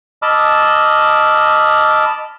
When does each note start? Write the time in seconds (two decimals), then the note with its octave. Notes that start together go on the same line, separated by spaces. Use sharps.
0.22 D#5 A5 B5 D6 E6 F6